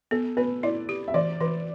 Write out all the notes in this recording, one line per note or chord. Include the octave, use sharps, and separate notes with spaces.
B3 A4
B3 B4
E4 D5
G4
E5
E3 D5
E3 B4